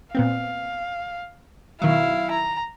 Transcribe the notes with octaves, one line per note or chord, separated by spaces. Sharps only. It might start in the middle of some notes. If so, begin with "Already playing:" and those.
A#2 B3 C4 F5
B2 D#3 F#3 E4 F5
A#5